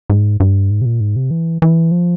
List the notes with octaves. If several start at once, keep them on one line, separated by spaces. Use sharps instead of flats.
G#2
G2
G#2
C3
A#2
G#2
C3
E3
E3
F3